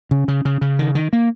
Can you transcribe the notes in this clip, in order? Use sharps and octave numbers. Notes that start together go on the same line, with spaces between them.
C#3
C#3
C#3
C#3
D#3
D#3
A#3